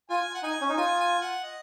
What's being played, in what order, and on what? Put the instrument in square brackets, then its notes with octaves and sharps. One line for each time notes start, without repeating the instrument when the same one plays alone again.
[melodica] F4 [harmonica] G#5
[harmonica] F#5
[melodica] D#4 [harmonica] G#5
[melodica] C#4
D#4
[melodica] F4 [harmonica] G#5
[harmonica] G#5
F#5
D#5